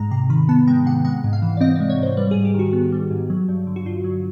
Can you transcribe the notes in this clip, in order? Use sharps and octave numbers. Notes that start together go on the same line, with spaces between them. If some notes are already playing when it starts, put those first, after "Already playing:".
Already playing: G#2 G#3 A#5
C3 A#5
D#3 B5
B3 A5
G#3 G5
C3 F#5
G#3 F#5
G#2
F5
E3
D5
C4 D#5
G#3 D5
C#5
G#2 C5
G3 B4
G#2 G#4
G4
D#3 F#4
B3
G3
G#2
F#3
G2
D3
F#4
G2 F4
F#3